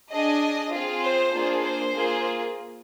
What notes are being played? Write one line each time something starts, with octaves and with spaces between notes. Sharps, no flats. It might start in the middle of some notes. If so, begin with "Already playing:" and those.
D4 G#4 D#5
C4 F4 G#4
C5
A#3 D4 F4 G#4
C5
A#3 F4 G#4